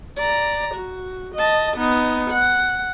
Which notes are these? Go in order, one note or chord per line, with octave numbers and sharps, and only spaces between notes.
D5 A#5
F#4
D#5 A5
B3 D#4
F#5